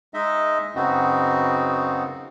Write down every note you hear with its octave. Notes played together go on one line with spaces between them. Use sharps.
G#3 D#4 D#5 E5
F#2 C#3 B3 C4 D#4 F#4